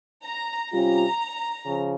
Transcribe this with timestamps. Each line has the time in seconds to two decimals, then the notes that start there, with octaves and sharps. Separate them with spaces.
0.26 A#5
0.72 C3 G3 C#4 F4 A#5
1.65 C#3 F3